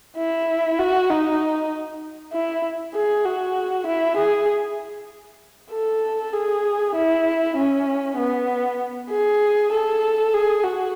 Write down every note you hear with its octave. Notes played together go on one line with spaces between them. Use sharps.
E4
F#4
D#4
E4
G#4
F#4
E4
G#4
A4
G#4
E4
C#4
B3
G#4
A4
G#4
F#4